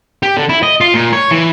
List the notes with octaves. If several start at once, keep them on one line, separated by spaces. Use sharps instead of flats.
G4
D3
E4
D#5
F4
A#2
C#5
E3